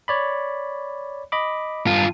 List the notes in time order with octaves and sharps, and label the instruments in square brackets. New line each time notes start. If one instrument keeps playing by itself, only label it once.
[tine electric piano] C#5 D5 B5
D#5 B5 D6
[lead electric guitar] G2 F4